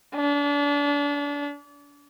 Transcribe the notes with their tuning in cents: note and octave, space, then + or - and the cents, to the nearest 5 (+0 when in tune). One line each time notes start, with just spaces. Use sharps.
D4 -35